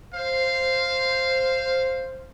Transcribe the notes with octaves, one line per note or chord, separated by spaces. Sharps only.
C5 F5